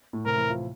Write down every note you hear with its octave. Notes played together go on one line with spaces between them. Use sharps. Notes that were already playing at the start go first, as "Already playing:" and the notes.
A2 A3
C3 C4 A#4
E3 E4
F3 F4